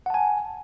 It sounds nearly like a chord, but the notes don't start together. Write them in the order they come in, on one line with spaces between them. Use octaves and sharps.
F#5 A5 G#5